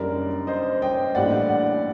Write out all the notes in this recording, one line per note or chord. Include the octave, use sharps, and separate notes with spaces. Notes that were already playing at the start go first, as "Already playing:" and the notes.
Already playing: F#1 F#2 D#3 G3 D4 A#4 D5
C5 D#5
D#5 G5
A1 A2 G3 A#3 D4 D5 F#5
D5 F#5